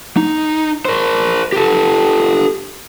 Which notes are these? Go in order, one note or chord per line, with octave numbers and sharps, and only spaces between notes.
D#4
A#4 C5
G4 A4